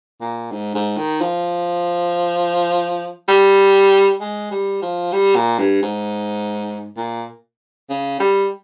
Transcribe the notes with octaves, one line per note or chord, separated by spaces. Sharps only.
A#2
G#2
G#2
D#3
F3
G3
G#3
G3
F3
G3
A#2
G2
G#2
A#2
C#3
G3